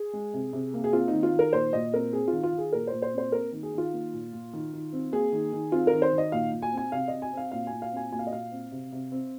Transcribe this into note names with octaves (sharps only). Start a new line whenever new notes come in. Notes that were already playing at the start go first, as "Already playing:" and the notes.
Already playing: G#4
G#3
C3
C3
A#3
G#4
C4 F4
D#4
D#3
F4
D#3
A#4
A#2 C5
A#2 D#5
C4 A#4
C4 G#4
F4
D#3
F4
D#3
G#4
A#2 A#4
A#2 C5
C5
C4 C5
A#3 A#4
D#3
G#4
D#3 F4
A#3
A#2
A#2
D#3
D#3
C4
A#3 G#4
D#3
D#3
C4 F4
A#4
D#3
C5
D#3
D#5
A#2 F5
A#2
G#5
C4 G#5
C3 F5
C3 D#5
G#5
C4 F5
A#2 F5
A#2 G#5
F5
C4 G#5
A#2 G#5
F5
D#5
A#2 F5
C4
C3
C3
C4